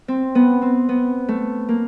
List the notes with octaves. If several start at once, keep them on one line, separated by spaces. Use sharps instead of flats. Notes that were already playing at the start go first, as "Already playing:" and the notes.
C4
B3
C4
B3
A3
A#3